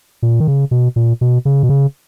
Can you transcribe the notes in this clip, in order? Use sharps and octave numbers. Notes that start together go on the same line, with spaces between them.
A#2
D#3
C#3
B2
A#2
B2
C#3
B2
C#3